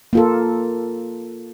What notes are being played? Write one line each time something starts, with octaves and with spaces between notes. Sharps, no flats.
A#3 F4 A4